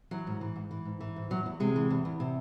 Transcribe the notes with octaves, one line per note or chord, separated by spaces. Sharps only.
E3 F#3
G#2
E3
G#2
E3
G#2
E3
G#2
E2 F#3
E2
C3 G#3
E3
E2
E2
C3